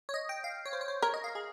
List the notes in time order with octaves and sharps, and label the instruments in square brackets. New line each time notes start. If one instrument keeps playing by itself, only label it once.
[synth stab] C#5
D#5
G5
F5
C#5
C5
C#5
C5
[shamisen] A#4 [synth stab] C#5
[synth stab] D#5
F5
G#4